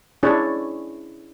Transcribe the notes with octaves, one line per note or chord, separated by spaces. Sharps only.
C#4 D4 E4 G#4 C#5